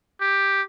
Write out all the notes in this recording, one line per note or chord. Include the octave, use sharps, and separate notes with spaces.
G4